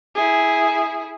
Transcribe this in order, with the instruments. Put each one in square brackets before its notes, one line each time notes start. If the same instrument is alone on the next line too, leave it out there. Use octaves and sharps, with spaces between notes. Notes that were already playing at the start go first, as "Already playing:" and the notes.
[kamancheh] E4 G#4